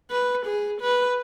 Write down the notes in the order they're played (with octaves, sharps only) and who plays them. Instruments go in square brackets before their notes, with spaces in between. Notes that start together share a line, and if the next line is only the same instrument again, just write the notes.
[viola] B4
G#4
B4